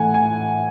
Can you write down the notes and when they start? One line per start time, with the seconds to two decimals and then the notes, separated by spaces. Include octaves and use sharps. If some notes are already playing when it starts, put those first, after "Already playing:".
Already playing: A2 E3 A3 E4 F#5 G#5
0.14 G#5